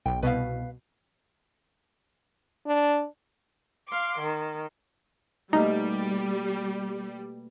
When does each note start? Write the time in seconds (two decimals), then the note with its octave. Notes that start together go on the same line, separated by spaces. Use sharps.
0.06 B1 G5
0.22 C2 B2 B4 F5
2.66 D4
3.88 F5 C6 D6
4.18 D#3
5.53 B2 G3 A3 A#3 D#4